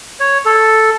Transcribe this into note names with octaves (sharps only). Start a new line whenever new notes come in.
C#5
A4